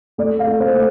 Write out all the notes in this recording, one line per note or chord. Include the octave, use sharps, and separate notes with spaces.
A3 D5
F5
A3
C5
A3